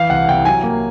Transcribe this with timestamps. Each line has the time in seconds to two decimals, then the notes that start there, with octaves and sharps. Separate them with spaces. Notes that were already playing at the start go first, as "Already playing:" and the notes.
Already playing: E3 F5
0.10 C2 F#5
0.28 C2 G5
0.45 F#3 G#5
0.63 A#3